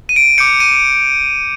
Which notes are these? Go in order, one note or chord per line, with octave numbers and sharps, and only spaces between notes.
D#7
D7
D6 G6 C#7
D#7